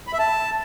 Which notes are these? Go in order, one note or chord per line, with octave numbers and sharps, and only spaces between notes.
B5
E5
A5